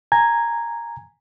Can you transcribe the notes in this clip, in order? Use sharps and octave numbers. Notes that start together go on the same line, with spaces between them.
G#5 A#5 G#6